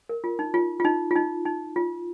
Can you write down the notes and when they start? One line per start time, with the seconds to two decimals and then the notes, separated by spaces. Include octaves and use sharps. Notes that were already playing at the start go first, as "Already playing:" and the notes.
0.09 A#4
0.24 F4
0.39 D#4
0.54 F4
0.80 F4
0.85 D#4
1.11 F4
1.16 D#4
1.45 D#4
1.76 F4